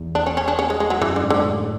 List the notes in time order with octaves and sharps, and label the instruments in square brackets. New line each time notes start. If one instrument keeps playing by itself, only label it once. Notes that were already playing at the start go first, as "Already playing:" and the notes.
Already playing: [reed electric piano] E2
[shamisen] D4
C#4
C#4
D4
C#4
G#3
G#3
F#3
[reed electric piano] F#2 [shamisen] E3
[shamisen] D3
[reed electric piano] G#2
[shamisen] D3
[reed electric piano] A2